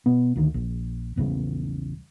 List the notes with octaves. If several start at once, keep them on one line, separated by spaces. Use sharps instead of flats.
B2 B3
D2 D#3
A#1
A#1 E2 C#3 G3